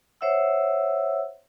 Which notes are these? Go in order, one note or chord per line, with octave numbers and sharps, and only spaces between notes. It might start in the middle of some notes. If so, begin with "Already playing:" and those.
C5 C#5 E5 F#5 E6